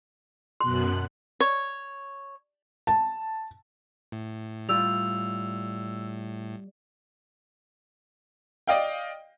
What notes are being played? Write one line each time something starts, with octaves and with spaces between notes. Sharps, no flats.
F#2 B2 C6 F#6
C#5
A5
A2
G3 F4 E6 F7
D5 D#5 F5 G5